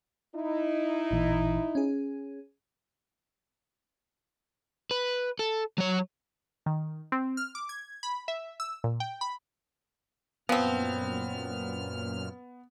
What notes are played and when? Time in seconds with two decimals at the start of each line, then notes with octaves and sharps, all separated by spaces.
0.36 D#4 E4
1.11 A1 A#2 E3
1.75 C#4 G#4
4.91 B4
5.39 A4
5.78 F#3 C#5
6.66 D#3
7.12 C4
7.37 F6
7.55 D6
7.69 G#6
8.03 B5
8.28 E5
8.60 E6
8.84 A#2
9.00 G5
9.21 B5
10.49 F#2 A#2 F3 B3 C4 F6